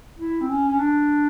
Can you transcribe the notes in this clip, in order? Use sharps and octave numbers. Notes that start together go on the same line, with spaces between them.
E4
C4
C#4
C#4
D4